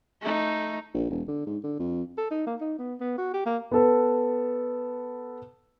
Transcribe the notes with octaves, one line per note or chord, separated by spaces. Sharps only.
A3 D#4
A#1
E1
D3
G#2
D3
F2
A4
D#4
A#3
D#4
B3
B3
F#4
G4
A#3
B3 A4 B4